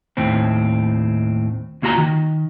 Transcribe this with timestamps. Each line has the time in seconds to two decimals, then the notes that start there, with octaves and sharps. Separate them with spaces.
0.17 D#2 A2 C4
1.82 D2 A#3 F4 F#4 A#5
1.98 D#3